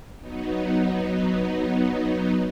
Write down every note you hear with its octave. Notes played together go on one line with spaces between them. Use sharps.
F#3 B3 D#4